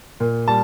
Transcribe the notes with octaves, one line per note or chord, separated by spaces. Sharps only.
A#2
G3 A5